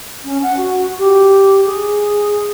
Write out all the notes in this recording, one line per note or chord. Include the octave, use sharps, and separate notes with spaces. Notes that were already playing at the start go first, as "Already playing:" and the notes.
C#4
F#5
F#4
G4
G#4